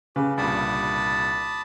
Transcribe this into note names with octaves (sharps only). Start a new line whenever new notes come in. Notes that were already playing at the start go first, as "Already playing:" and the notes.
C#3 G4 B4
C2 G2 A#2 D5 A5 B5 D#6